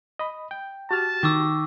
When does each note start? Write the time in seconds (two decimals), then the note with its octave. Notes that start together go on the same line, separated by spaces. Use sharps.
0.19 D#5 B5
0.51 G5
0.91 F#4 G4 A5 F6
1.23 D#3 C#6 D6 E6